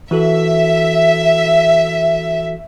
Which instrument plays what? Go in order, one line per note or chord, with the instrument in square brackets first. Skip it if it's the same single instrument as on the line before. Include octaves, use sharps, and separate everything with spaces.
[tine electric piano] E3 F#4 A4 [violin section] E5